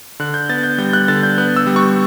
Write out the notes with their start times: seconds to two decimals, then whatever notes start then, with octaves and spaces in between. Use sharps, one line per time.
0.20 D3 F#6
0.34 G6
0.49 B3 A6
0.63 G6
0.78 G3 G6
0.93 F#6
1.08 D3 A6
1.23 G6
1.38 B3 F#6
1.56 E6
1.67 G3
1.76 C#6